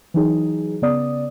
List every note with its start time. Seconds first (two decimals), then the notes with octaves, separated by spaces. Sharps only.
0.14 E3 F#3 D#4 G#4
0.82 C#3 B3 D5 D#6